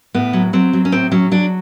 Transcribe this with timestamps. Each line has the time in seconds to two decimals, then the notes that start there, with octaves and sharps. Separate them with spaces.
0.14 A2 B3
0.33 F#3
0.53 F#3 C4
0.73 F#3
0.85 C#4
0.92 A2 C4
1.12 F#3 C#4
1.31 F#3 D4